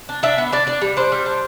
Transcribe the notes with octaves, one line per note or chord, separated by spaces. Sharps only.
D4
D4 E5
B3
D4 D5
D4 D5
G3
D4 C5
G3
D4